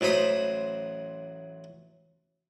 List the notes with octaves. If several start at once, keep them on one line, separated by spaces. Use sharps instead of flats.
A1 F#3 C5 B5 D#6